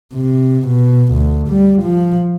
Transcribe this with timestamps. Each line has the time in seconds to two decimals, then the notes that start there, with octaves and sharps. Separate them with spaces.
0.14 C3
0.68 B2
1.13 D2
1.48 G3
1.82 F3